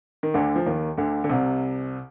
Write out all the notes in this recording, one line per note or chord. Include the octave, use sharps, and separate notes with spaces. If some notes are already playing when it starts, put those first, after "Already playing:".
D#3
D2 D3
F3
D#2 D#3
D2 D3
D3
C2 C3